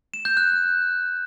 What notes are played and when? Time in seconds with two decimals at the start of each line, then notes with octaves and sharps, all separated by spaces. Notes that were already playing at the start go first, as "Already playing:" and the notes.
0.14 E7
0.25 G6
0.37 F#6